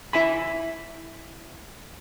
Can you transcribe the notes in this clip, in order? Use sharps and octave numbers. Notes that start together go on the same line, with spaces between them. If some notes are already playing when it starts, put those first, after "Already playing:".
E4 E5 G#5 B5